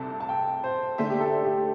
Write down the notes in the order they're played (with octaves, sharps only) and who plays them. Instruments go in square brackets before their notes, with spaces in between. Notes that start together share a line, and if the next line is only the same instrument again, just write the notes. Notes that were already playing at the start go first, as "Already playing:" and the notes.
Already playing: [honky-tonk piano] C2 C3 C4 A4 [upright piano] A5
[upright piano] A5
G5
C5
[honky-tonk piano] D3 A3 D4 C5 E5
[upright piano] G4
A4
G4